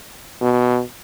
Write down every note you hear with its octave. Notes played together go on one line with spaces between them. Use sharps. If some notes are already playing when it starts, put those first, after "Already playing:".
B2